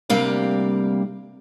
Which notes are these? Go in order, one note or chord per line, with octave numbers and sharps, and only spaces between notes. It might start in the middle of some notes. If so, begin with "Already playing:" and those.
D2 C3 G3 A#3 F5